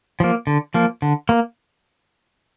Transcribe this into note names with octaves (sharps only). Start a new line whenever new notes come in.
F3 A#3
D3
F3 A#3
D3
A#3